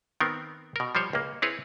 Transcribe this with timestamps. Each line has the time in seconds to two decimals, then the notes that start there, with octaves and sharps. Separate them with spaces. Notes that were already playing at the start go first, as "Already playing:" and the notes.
0.20 D#3 B3 C4 A#4
0.76 B2 A#4
0.95 F3 G3 C5 C#5
1.13 C#2 A#3
1.42 C4 E4 G#4 B4 C#5